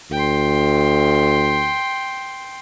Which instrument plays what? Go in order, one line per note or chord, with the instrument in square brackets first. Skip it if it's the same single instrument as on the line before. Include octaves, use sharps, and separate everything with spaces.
[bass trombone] D2 [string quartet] G5 C6